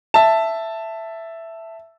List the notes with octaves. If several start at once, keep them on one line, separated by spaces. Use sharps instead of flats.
E5 A5